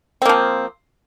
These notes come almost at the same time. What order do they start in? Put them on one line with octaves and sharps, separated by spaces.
C4 A#3 F3